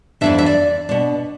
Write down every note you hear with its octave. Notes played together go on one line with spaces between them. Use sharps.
F2 E3 B3 D4 E5
E5
D5
B2 B3 D4